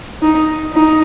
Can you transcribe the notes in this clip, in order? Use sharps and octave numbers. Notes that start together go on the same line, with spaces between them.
D#4
D#4